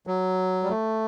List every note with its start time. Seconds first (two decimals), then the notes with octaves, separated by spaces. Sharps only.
0.07 F#3
0.63 G3
0.70 A3